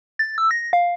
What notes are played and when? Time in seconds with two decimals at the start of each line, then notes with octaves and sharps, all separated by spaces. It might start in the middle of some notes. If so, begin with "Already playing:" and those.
0.19 A6
0.38 E6
0.51 A#6
0.73 F5